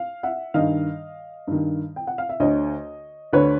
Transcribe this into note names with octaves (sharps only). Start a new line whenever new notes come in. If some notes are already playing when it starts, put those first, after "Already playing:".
Already playing: F5
E5 F#5
G2 D#3 D#5 F5
G2 D#3
G5
F#5
F5
E5
D2 D3 C#5 D#5
D2 D3 B4 C#5